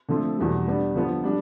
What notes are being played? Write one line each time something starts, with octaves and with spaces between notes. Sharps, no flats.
D3 F3 A3 C4 F4
E2 B2 G3
G3 B3 D4
D3 F3 B3
G3 D4